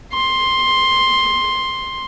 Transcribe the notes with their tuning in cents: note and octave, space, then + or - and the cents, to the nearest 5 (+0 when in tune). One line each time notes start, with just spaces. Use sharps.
C6 +10